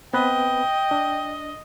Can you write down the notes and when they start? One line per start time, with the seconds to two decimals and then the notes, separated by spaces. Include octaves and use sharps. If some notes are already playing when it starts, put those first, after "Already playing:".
0.14 B3 C4 B4 D#5 G5
0.91 D4